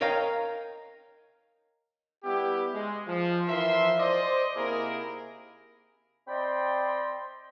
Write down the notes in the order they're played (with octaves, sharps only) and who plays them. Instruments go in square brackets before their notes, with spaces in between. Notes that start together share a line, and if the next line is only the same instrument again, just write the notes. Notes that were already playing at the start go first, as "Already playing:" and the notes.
[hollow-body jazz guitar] A#4 C#5 D#5 F5 G5 A#5
[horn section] G3 B3 E4 G4
G#3
F3
E3 F3 A#4 E5 C6
C5 D5 D#5
C3 A#3 D#4 E4 G#4 A#4
[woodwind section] C4 D5 D#5 G5 B5 C6